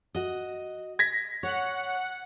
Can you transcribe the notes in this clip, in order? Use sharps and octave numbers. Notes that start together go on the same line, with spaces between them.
F#4 D#5
G#6 A#6 B6
C#5 F#5